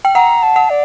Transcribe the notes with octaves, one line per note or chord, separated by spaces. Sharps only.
G5
F#5 A#5
A5
F#5
D5